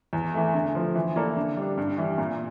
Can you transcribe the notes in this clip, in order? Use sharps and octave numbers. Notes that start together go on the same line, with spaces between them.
E2
E3 A3
D3
F3 A3
E3
A#3 E4 A4 D5
D3
G3 D4
G2
E3 G3
A#2